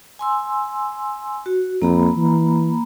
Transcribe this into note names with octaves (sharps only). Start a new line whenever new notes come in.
G#5 C6 E6
F#4
F2 A#3 A#5 B5
E3